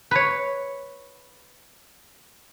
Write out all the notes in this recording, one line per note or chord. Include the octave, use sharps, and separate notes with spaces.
B4 C#5